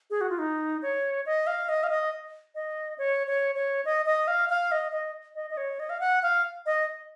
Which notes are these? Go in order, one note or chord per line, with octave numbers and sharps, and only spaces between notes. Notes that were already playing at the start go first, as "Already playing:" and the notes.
G#4
F#4
F4
D#4
C#5
D#5
F5
D#5
F5
D#5
D#5
C#5
C#5
C#5
D#5
D#5
F5
F5
D#5
D#5
D#5
D#5
C#5
D#5
F5
F#5
F5
D#5